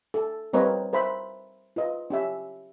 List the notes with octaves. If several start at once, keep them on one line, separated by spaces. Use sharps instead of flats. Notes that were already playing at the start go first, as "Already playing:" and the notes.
A4
G3 C4 A#4 B4 C#5 D#5
A#4 C5 E5 B5
F4 B4 D#5
C#4 G4 E5